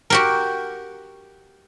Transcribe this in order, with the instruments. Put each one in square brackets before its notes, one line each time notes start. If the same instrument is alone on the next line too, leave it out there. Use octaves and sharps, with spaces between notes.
[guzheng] F#4 G4 A#4